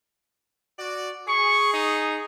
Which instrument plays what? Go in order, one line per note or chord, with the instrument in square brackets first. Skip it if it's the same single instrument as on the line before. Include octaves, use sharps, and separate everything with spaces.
[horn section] F#4 D5
[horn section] G#4 [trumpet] C#6
[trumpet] D#4